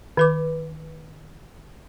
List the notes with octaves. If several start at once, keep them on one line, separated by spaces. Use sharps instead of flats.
D#3 B4 D6